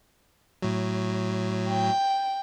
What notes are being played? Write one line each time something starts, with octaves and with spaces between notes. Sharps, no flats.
A2 F#3
G5